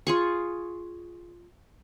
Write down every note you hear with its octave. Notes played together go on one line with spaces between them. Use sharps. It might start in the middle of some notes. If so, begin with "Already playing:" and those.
F4 G#4 C#6